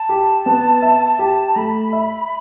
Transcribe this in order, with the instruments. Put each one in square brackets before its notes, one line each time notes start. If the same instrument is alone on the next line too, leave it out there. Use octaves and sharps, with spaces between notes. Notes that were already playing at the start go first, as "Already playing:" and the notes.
Already playing: [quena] A5
[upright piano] G4
B3
E5
G4
[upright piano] A3 [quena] B5
[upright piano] E5